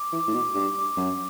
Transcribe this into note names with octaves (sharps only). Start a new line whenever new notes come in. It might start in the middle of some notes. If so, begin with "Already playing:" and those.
Already playing: D6
E3
A2
B2
G2
F#2